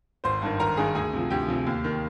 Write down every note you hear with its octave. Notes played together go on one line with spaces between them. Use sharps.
G#1 C5 C6
G2 D#3
G#1 A#4 A#5
G2 D#3 G#4 G#5
D2 G#4 G#5
C3 F3
D2 G4 G5
C3 F3
D#2
D#3